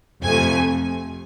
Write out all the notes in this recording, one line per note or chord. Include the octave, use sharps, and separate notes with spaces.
F2 C3 F3 A3 G#5